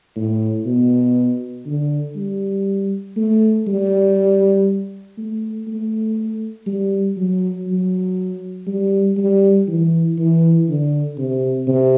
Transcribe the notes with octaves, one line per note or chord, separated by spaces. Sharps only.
A2
B2
D3
G3
A3
G3
A3
A3
G3
F#3
F#3
G3
G3
E3
E3
D3
C3
C3